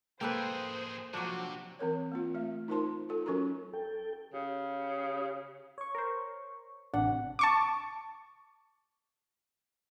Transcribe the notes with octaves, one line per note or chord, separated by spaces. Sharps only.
F3 A#3 G#4 A4 B4 C5 G5
C3 F3 F#3 D4 F#4
E3 C4 A#4 C#5
A#3 C4 F4
A3 E5
D#4 F4 A#4 C5 A5 C6
F4 A4
F#3 C#4 F#4 A4 A#4 A#5
A4 G5
C#3 G4
C#5 C#6
A#4 C5
A1 C3 D4 F#5
A5 C#6 D6